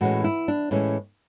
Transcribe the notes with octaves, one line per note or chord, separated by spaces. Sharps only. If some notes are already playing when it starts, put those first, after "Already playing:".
A2 E3 G#3 C#4 F#4
E4
D4
A2 E3 G#3 C#4